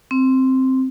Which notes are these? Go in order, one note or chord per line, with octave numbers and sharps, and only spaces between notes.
C4